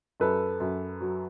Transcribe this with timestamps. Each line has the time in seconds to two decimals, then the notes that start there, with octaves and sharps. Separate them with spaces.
0.20 F#2 A4 B4
0.60 F#2
1.01 F#3